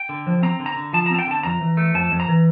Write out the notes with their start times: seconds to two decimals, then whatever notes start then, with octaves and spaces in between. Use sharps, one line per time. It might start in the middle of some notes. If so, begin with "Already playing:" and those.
Already playing: G5
0.09 D3
0.27 F3
0.43 C4 A#5
0.59 D3
0.66 A#5
0.76 D3
0.93 F3 A5
1.06 A#5
1.10 C4 A5
1.19 G5
1.27 D3 A5
1.43 F2 A#5
1.61 E3
1.77 A3
1.94 F2 A5
2.12 F2
2.20 A#5
2.28 E3